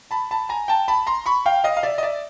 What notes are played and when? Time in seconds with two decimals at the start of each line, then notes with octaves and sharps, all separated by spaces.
0.11 A5 B5
0.31 A5 B5
0.49 G#5 A#5
0.68 G5 A5
0.88 A5 B5
1.07 A#5 C6
1.26 B5 C#6
1.46 F5 G5
1.64 D#5 F5
1.77 F5
1.83 D5 E5
1.98 D#5
2.03 D5 E5